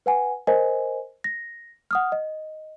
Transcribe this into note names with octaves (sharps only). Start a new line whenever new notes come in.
B4 F#5 G#5
A#4 C5 D#5 G#5
A#6
F#5 D#6 F6
D#5